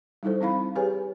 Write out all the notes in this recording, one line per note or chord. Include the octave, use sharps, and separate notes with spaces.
G3 D#4 E4 A4 C5
C4 E4 F5 B5
G4 G#4 B4 C#5 G#5